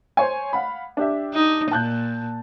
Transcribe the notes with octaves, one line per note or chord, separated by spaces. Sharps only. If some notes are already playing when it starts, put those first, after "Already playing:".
C5 C#5 G#5
F5 F#5 B5
D4 G4 E5
D#4
A#2 A5 F#6 G6